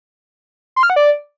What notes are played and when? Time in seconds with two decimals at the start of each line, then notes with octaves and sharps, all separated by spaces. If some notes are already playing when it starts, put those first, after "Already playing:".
0.76 C6
0.83 F6
0.90 F#5
0.96 D5